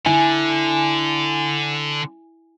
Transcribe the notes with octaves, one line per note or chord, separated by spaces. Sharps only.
D3 E4 G#5